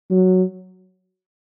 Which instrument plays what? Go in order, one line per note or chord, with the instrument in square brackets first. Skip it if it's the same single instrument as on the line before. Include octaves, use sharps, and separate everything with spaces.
[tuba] F#3